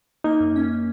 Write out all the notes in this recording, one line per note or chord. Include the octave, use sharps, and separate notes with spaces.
A#3 D#4
F#2
C#4